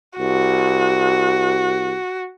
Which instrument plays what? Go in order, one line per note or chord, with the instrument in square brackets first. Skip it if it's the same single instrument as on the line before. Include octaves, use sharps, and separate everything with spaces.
[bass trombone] C2 [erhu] F#4